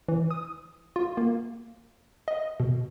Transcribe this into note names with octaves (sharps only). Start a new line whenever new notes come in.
E3
D#6
F4
A#3
D#5
B2